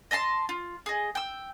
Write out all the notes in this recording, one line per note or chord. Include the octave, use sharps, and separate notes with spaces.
D#5 E5 A5 C6
F4
G#4 D#5
G5 E6